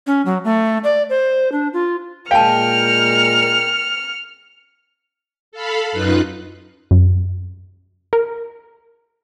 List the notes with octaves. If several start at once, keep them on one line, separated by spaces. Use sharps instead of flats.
C#4
F#3
A3
D5
C5
D4
F4
A#2 G#3 A#4 F5 G5 A5 F6 C#7
A4 F5 B5
F#2 D#4 F4 B4 F#6
F#2
A#4